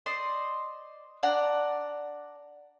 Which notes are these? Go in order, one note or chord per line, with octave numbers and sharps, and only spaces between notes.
C5 D5 D#5 C6
D4 D5 F#5 A#5